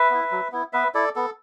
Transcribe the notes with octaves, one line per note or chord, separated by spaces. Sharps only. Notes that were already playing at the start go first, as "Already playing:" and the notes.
Already playing: B4 E5
B3 E4
F#3
B3 E4
B3 B4 E5
E4 A4 D5
B3 A4